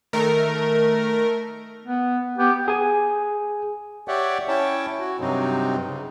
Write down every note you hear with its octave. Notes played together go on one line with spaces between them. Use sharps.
D#3 A3 A#4
B3
B3 G4
G#4 G#5
G4 C#5 D5 E5 F#5 G5
C#4 E4 C#5 G5 A5
F#4
G2 C3 F#3 C4 D#4
C#3